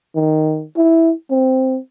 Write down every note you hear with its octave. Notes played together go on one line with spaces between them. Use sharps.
D#3
E4
C4